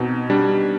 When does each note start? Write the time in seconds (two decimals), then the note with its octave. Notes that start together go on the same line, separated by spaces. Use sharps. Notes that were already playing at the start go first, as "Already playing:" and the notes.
Already playing: B2 C4 D#4
0.30 G3 D4